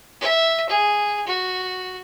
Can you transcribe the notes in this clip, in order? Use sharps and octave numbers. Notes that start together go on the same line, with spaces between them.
E5
G#4
F#4